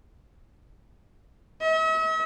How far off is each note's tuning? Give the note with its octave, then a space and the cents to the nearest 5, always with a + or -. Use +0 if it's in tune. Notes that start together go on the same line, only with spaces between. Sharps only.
E5 -45